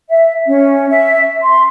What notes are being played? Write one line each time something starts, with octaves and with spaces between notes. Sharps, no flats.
E5
C#4
E5
C6